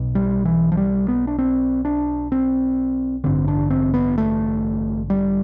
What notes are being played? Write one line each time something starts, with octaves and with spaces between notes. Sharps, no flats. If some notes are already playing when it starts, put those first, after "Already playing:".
Already playing: B1 B2
G3
E3
F3
G3
B3
D4
C4
D4
C4
A1 G2 D3 C4
D4
C4
B3
A3
G3